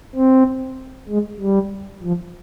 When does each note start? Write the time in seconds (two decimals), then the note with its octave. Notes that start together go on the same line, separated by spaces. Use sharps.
0.15 C4
1.08 G#3
1.40 G3
2.03 F3